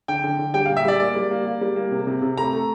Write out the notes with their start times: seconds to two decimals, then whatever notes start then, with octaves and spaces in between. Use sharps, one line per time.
0.08 D3 G5
0.24 D3
0.39 D3
0.54 G3 G5
0.66 A#2 F5
0.77 E5
0.85 G3 D5
1.00 A#3 D5
1.15 G3
1.31 A#3
1.46 A#3
1.61 G3
1.76 A#3
1.91 C3
2.07 C3
2.22 C3
2.38 A3 A#5
2.53 A3